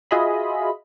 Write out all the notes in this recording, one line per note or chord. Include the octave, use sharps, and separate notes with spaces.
F4 F#4 G#4 D#5 E5 B5